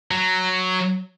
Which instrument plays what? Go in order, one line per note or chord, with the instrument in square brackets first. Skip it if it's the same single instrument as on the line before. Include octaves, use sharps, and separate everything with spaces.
[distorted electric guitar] F#3